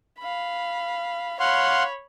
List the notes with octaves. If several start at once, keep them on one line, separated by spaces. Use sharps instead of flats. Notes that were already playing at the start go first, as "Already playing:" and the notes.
F5 B5
C#5 F5 F#5 B5 C6